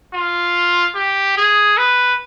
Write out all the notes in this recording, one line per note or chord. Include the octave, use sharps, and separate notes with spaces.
F4
G4
G#4
B4